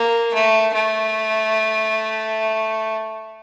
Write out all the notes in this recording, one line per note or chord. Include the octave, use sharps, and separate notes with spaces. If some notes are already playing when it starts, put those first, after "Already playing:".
Already playing: A#3
A3
A3